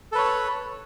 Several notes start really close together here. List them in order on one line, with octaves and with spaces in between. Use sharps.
A4 B4 C#5